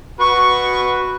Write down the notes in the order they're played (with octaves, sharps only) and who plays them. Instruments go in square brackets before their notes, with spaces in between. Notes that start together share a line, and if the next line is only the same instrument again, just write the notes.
[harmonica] F#4 B4 [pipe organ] C#6